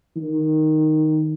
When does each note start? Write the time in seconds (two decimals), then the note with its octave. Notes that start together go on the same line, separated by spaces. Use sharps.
0.16 D#3